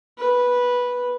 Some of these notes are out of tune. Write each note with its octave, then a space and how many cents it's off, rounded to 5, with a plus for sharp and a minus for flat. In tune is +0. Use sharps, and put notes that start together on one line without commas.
B4 -10